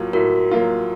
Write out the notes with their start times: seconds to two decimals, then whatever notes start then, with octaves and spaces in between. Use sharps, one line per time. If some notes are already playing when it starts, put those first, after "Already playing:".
Already playing: A2 F#3 A#3 F4
0.13 A2 F#4 A#4
0.51 F#3 A#3 F4